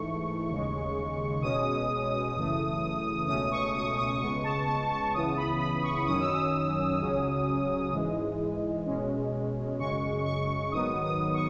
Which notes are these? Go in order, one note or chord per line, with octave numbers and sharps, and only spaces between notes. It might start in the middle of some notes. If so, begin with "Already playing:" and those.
Already playing: G#2 E3 A3 C#6
D#2 C#3 G#3
B2 G#3 C#4 D#6
F#2 C#3 E3 A3
C#2 B2 A3 C#4 D#6
C#6
D#6
D#6
C#2 C#3 G#3 B3 C#6
A5
A5
A5
C#2 C#3 E3 B3 D#6
B5
B5
C#6
F#2 D#3 F#3 C#4 D#6
E6
D#6
C#2 C#3 F#3 C#4
G#2 E3 G#3
B2 G#3 C#4
F#2 C#3 G#3 C#6
C#6
G#2 D#3 F#3 B3 D#6
D#6
C#6